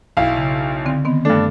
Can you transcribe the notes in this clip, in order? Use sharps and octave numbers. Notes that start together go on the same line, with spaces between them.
B1 E4 F5
C#3
D3 C4
D#3 B3 C4
G2 A3 D4 A4